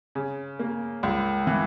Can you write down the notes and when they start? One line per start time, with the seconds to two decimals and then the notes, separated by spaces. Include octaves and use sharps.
0.15 C#3
0.59 A#3
1.03 C#2
1.47 E3